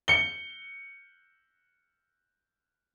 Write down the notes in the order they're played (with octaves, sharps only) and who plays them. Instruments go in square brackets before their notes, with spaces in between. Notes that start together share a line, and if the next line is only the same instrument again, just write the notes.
[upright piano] C#7 G7